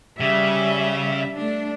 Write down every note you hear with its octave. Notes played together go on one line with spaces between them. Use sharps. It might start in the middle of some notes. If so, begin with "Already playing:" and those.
C#3 G3 E5
A3 D4